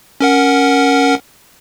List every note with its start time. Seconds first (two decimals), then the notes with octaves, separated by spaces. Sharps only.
0.21 C#4 A#4 F#5